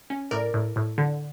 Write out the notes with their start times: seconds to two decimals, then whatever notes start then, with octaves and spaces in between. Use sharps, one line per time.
0.10 C#4
0.31 A2 A#4 D5
0.54 A2
0.76 A2
0.98 D3